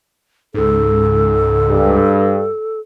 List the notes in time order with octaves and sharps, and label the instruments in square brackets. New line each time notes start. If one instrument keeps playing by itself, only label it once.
[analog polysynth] C#2 G#2 [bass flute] A4
[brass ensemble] G2